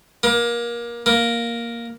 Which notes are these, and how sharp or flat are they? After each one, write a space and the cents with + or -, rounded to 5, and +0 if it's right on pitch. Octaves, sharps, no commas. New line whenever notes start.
A#3 +25
A#3 +5